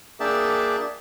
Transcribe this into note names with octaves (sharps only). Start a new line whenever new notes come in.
A#3 D4 G#4 E5 G5 A5